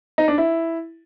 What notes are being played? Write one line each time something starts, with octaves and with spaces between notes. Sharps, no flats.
D#4
D4
E4